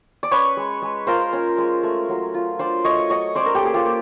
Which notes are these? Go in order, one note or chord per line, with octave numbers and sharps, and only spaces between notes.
D5
C#4 B4 C#5
G#3
G#3
F4 A#4 C5
C#4
G#3
A3
F#3
F4
D4 C5 D5
A3 C#5 D#5
F#3 C#5 D#5
C#4 C5 D5
A#4
G4 A4
A#3 G#4
F4 G4
A#3